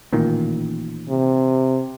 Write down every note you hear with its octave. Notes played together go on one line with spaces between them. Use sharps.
A1 A#2 D#3
C3